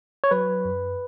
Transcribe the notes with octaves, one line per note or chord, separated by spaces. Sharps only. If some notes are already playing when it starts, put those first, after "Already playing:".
C#5
F#3 B4
F#2